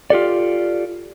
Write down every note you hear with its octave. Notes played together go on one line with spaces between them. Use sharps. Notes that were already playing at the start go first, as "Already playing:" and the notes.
F4 G4 A4 D5